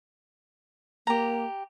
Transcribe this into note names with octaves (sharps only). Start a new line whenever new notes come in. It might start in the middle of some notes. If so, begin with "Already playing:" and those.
A#3 G4 A#5